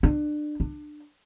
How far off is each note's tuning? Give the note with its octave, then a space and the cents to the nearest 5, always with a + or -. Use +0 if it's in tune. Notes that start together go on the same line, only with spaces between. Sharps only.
D4 +25
D4 +25